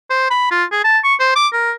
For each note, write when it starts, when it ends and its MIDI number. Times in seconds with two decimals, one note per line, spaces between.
0.10 0.29 72
0.31 0.49 83
0.51 0.64 65
0.72 0.83 68
0.84 0.99 81
1.04 1.15 85
1.20 1.32 72
1.36 1.48 86
1.53 1.72 70